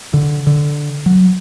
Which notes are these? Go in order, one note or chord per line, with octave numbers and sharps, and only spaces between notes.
D3
D3
F#3